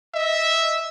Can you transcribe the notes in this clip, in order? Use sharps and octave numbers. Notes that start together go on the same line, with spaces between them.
D#5 E5